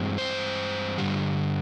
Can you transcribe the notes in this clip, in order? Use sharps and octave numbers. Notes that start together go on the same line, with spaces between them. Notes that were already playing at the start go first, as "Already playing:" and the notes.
Already playing: G2 E3 G#3 C4
C5
G2 D3 G3